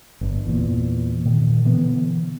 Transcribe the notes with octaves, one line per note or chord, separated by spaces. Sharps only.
G1
E2 A#2
A#2 D#3
B2 D3 E3 B3